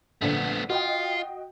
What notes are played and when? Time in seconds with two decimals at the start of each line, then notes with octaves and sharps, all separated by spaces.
0.21 A#1 D3 A3 B3 B6
0.70 F4 F#4 D#5 G5